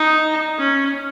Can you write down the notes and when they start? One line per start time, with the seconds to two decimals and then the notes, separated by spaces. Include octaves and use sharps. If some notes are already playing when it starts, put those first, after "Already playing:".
Already playing: D#4
0.58 C#4